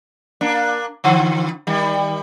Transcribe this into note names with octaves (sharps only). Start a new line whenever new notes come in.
A#3 D4
D3 F3
D#3 G3